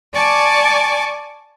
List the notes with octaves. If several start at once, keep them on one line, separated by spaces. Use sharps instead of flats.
D5 G#5 A5 C#6 D6